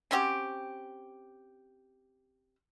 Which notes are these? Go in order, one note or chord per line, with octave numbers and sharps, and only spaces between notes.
C4 C#4 F#4 G4